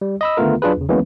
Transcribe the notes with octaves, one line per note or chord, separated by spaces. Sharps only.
G3
D#5 B5 E6
D3 D#3 A3 B3 F4 A#4
F#3 D4 F4 G#4 B4
E2 C#3
E3 F#3 G#3 A#3 B3 C#4